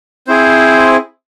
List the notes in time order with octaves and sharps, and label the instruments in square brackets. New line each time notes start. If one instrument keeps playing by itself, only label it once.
[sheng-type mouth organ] C4 E4 G#4 C5